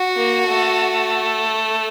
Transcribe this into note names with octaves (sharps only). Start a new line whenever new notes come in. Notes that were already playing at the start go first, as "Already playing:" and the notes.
Already playing: F#4
A#3
A3